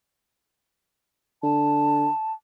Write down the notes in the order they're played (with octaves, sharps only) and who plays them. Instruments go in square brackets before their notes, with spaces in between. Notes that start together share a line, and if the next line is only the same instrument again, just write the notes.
[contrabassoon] D3 [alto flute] A5